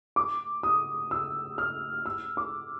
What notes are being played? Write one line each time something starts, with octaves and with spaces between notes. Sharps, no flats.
D6
D#6
E6
F6
E6
D6